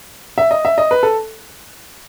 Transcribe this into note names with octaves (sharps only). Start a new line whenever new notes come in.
E5
D#5
E5
D#5
B4
A4